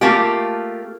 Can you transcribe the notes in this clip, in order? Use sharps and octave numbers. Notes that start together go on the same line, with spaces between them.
A3 A#3 F4 G4